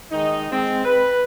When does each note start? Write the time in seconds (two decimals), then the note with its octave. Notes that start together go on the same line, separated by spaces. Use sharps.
0.12 D#3 G#3 D#4
0.52 G#3 C4
0.85 B4